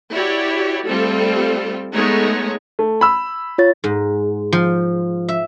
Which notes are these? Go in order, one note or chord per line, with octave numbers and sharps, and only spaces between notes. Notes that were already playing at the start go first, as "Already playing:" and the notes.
E4 F#4 G4 C#5 D5
G3 A3 C4 F4 A4
G#3 A3 B3 D#4 C#5
A3
B5 E6
F4 C#5 A6
G#2
F3
E5